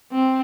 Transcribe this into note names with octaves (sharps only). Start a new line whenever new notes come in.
C4